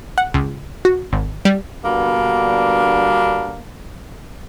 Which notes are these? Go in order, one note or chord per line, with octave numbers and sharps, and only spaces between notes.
F#5
C#2
F#4
G#1
G3
B2 D3 G3 A#3 B3 D4